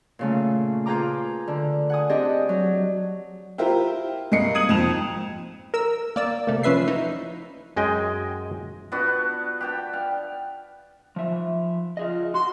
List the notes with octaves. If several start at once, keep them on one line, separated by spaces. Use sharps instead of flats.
A#2 C#3 A3
F4 G#4 B4 G5 A#5 D6
D3
F#5 G#5 D#6
C4 D4 G4 G#4 D#5
F#3
E4 F4 G4 A#4 C5
G2 G#3 A#3 D#5 C7 C#7
D#6 G#6 D#7 F#7
F2 G#2 E7 F7
A#4 E6
A#3 D5 E6
C3 A3 A#3
F3 C#4 B4 E5 C7
D#4 E4
F#2 G#3 D#5 G5 G#5
B3 D4 F4 F#4
G4 G5 A5
F5
F3 E5
F4 G#4 D#5
F#4 C6